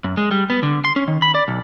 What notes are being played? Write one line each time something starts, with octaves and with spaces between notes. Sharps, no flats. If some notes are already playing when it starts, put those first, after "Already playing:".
F#2
G#3
G3
B3
D3
C6
C#4
D#3
B5
D5
B1